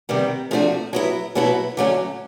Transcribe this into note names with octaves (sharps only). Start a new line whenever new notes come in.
C3 D#3 G3 B3
C3 F3 A3 D4 F#4
F#3 B3 E4
B2 F#3 B3 E4
D3 F#3 A3 C#4